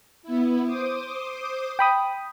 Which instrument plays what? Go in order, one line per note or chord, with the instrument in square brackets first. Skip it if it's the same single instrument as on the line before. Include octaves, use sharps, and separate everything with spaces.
[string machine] B3 E4
C5 D6 D#6
[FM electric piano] G5 B5 D#6